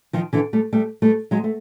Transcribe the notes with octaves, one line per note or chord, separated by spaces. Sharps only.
D#3 F3
D3 E3
G3 A3
G3 A3
G3 A3
F#3 G#3
A3